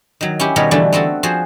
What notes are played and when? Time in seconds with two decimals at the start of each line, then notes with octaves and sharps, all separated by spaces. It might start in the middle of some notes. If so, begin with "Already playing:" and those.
0.21 D#3 F#3
0.40 C#4 E4 G4
0.56 B2 D#3 G3 B3 A#4 C#5
0.71 D3 E3 G3 A3 D4
0.93 B3 C4 F#4 A4
1.23 F3 F#4 G#4 C5